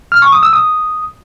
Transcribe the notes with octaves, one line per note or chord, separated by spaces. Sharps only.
F6
C#6
D#6
E6
D#6